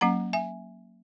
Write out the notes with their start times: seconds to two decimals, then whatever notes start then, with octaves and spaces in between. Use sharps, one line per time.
0.01 F#3 A#3 C#4 F#5 A#5
0.33 E5 G#5